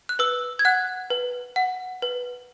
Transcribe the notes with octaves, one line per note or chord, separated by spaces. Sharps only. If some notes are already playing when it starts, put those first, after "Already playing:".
F#6
B4 E6
G#6
F#5 F#6
B4
F#5
B4